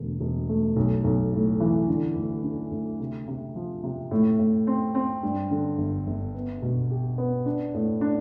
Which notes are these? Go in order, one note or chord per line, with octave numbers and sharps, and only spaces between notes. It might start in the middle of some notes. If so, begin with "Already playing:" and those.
Already playing: E1 D2
E1
A3
B1
B1
A2
E3
D3
D2
D3
D2
C3
C3
F3
C3
A2
A2
C4
C4
G2
D3
G1
G1
B3
B2
G4
B3
D4
A2
D4